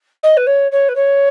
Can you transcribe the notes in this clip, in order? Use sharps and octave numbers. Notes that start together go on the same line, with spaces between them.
D#5
B4
C#5
C#5
B4
C#5